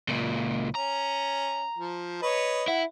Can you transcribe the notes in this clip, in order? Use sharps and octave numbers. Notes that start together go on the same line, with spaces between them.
C#2 A#2
C#4 A#5
F3
B4 C#5 D#5
E4 F#5